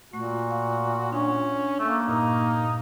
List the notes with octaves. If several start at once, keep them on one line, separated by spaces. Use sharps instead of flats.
A#2 A3 F#4
F5
C#4 D4
A3 A#3
G2 A#2 D#4